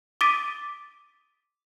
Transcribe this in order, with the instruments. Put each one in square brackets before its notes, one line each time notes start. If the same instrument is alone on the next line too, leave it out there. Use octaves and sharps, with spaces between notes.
[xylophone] D6 D#6 A6 B6 D7 D#7